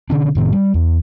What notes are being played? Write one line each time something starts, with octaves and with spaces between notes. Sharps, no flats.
B2 D3 C#4 D4
F1 A2 D#3 B3
G3
E2